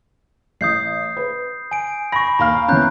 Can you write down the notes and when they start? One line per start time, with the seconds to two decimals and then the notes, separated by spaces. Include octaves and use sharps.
0.61 A1 D#6 G6 C7
1.17 B4
1.71 G#5 D7
2.12 B5 C#6 A#6
2.39 D#2 F5 A#5 F6
2.68 E3 B3 C#4 A#5 F#6 G6